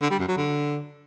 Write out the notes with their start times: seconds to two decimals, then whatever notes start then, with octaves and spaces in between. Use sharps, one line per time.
0.01 D3
0.10 G3
0.19 F#2
0.28 F#3
0.37 D3